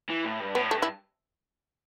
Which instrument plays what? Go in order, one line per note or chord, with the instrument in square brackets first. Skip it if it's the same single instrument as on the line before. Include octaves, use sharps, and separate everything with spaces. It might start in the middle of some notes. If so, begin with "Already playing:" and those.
[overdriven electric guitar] E3
A2
G2
[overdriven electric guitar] A2 [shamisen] B3
[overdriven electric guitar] G2 [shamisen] A3
[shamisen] E4